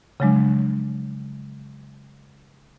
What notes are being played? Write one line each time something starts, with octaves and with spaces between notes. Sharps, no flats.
C#3 F3 F#3 G#3 D4